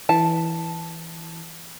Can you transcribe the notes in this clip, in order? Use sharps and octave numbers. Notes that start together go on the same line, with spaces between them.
E3 A5